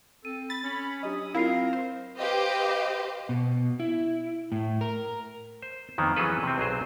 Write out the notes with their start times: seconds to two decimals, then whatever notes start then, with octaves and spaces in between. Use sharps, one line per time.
0.25 C4 A4 D#7
0.50 B5 A6
0.64 C#4 C#5 B5
1.03 F#3 D4 G4 D#5 D#6
1.35 F#3 C4 E4 F4 A#4 F5 B5 C7
1.73 C5
2.17 G4 B4 C5 D#5 F5
3.29 B2
3.80 E4
4.52 A2
4.81 A#4
5.62 C5
5.98 F2 D#3 A#3 B3
6.16 E3 F#3 C#4 G#4 A4 B4
6.43 C3 C4
6.58 B1 F#3 G#4 C5